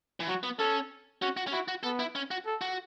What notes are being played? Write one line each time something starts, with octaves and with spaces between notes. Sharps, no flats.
E3
F#3 F#4
B3
C#4 A4
C#4 F#4
F#4
C#4
E4 F#4
F#4
B3 A4
E4
C#4
F#4
A4
F#4